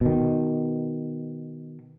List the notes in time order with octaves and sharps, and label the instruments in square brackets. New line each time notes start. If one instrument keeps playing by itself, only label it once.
[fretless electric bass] B2 D#3